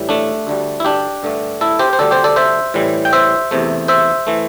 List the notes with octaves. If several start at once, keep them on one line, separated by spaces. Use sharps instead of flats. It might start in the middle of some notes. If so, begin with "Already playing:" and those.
Already playing: A2 E3 G3
A3 D4
D2 D3 G3
E4
D4 G4
G2 D3 A3
E4 A4
G4 C5
C5
D2 D3 G3 A4 D5
G4 C5
A4 D5
C5 E5
A2 E3 G3
G5
C5 E5
E2 C3 A3
C5 E5
E3 A3